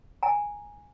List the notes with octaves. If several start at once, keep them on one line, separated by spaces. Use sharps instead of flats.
G#5 A#5